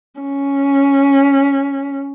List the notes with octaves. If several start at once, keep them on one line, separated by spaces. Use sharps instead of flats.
C#4